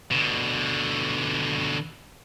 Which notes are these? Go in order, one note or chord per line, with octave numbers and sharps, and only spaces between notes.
B2 D3